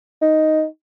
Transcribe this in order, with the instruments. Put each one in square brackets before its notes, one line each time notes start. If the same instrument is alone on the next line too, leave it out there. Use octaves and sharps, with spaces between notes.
[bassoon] D#4